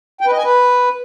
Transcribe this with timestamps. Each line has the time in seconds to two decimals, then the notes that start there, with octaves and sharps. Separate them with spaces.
0.21 G5
0.26 B4
0.32 D#5
0.38 G#5
0.44 B4